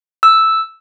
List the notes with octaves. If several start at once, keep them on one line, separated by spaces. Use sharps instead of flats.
E6